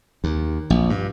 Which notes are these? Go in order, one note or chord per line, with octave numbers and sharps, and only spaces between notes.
D#2
A#1
G2